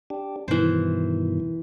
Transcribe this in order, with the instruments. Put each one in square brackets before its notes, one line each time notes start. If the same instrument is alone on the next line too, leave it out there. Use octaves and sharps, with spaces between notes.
[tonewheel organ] D4 G4
[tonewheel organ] G2 B2 D#3 [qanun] E3 C5